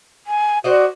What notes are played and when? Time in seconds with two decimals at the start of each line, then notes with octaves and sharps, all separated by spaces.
0.27 G#5
0.64 F#4 C5 D5 D#5